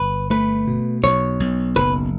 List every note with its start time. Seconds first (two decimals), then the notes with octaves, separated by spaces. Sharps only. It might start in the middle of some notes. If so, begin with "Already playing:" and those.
Already playing: G1 B4
0.30 A3 B4
0.67 B2
1.03 B1 C#5
1.40 B1
1.76 F#1 B4